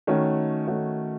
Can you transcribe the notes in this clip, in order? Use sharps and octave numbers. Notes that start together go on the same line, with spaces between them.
D#3 A3 C#4 F#4
D#3 A3 C#4 F#4